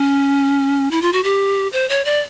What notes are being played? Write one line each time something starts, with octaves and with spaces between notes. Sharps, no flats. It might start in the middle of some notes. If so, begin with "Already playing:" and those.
Already playing: C#4
E4
F4
F#4
G4
C5
C#5
D5